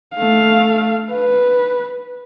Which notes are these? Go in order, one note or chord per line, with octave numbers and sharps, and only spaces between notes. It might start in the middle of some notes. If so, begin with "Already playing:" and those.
A3 F5
B4